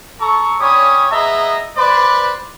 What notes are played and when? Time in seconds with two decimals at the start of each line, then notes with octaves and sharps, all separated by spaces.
0.20 A4 A#5 C#6
0.59 C#4 D4 G4 C#5 B5 D#6
1.11 B3 G#4 D#5 E5 A#5
1.77 B4 C5 D5